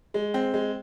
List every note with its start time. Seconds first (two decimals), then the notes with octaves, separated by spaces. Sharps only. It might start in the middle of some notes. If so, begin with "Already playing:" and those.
0.14 G#3
0.34 C4
0.54 G#3